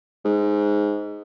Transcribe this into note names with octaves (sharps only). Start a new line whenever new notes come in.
G#2